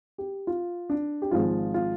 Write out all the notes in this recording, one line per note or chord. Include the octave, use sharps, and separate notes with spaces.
G4
F4
D4
G4
G#1 G#2 F3 G#3 F4
F4